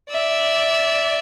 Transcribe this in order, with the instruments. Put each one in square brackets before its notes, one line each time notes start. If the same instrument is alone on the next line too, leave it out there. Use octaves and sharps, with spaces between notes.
[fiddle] D5 E5